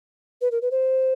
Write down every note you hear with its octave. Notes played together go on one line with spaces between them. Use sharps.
B4
A#4
B4
C5